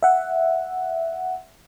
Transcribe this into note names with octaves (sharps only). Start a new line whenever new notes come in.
E5 F#5